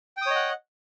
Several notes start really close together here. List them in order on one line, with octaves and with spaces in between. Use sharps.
G5 D#6 C#5 D#5 F#5